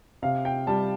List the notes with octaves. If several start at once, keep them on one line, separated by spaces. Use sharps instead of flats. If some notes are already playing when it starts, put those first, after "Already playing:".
C3 F5
G5
G3 A5